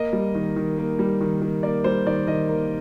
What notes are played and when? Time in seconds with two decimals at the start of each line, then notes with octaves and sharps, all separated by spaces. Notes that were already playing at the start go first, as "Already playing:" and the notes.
Already playing: A#3 D#5
0.13 G3
0.35 D#3
0.56 D#3
0.78 A#3
0.99 G3
1.21 D#3
1.41 D#3
1.63 A#3 D5
1.84 G3 C5
2.06 D#3 D5
2.27 D#3 D#5
2.49 A#3